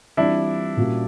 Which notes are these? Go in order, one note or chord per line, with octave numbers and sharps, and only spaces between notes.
E3 G3 C4 D4 E4 F4
A#2 G3 A#3 C#4 F#4